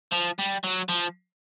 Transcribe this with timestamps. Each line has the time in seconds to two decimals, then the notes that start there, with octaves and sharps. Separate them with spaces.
0.13 F3
0.39 G3
0.64 F#3
0.89 F3